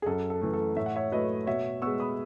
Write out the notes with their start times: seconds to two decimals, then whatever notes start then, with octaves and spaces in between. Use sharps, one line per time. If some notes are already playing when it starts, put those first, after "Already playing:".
0.02 G#4
0.06 F#2 A4
0.30 A4
0.41 E3 A3
0.53 A4
0.76 A2 E5
0.86 F#5
0.96 C#5 E5
1.12 F#3 A3 B4 D#5
1.47 B2 C#5 E5
1.82 G#3 B3 C#6 E6
2.00 B5 D#6